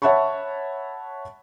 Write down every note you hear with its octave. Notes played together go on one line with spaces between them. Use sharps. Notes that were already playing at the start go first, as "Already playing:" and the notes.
C#5 E5 F#5 A5 B5 C#6